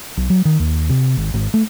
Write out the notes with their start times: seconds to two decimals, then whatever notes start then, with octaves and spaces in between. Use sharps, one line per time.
0.17 B1
0.30 F#3
0.45 D#3
0.60 D#2
0.89 C3
1.17 G#1
1.34 G#1
1.54 A3